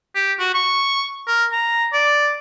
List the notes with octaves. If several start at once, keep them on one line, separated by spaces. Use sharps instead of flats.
G4
F#4
C#6
A#4
A#5
D5